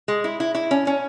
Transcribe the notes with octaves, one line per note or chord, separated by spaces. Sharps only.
G#3
E4
E4
E4
C#4
C#4